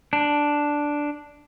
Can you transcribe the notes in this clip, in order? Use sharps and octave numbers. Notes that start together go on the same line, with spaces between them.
D4